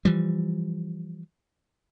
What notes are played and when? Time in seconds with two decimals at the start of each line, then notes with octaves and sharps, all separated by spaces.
0.05 E3 F3 G3